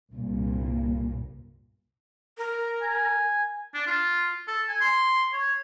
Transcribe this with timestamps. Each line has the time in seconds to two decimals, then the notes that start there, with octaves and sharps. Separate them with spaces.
0.12 C2 G2 A#2
2.38 A#4
2.82 G#5
3.74 D4
3.87 F4
4.48 A4
4.68 G#5
4.81 C6
5.33 C#5